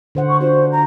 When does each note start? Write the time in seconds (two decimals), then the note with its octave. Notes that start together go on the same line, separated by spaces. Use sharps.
0.15 D3 C5 F#5
0.29 C#6
0.41 D4 F4 F#4 C5
0.72 A#5